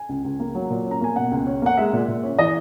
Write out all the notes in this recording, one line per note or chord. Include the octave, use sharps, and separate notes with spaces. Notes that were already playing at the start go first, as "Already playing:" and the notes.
Already playing: G#5
C#2
C#2
A#3
F#3
A#2
C#4
A#5
A#3 G#5
B2 F#5
C#2
C#4
A#3 F#5
G#3 E5
A#2
A#2
C#4
E3 D#5